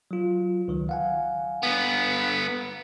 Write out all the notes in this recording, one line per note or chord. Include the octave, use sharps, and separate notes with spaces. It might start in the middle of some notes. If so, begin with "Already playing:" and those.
F#3 F4
C#2 D#3 F#3
F5 F#5 G#5
G2 B3